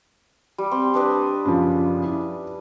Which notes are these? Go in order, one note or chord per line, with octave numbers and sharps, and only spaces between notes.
G3
C4
D4 B4 D#5
F#2 C#3 F3
E4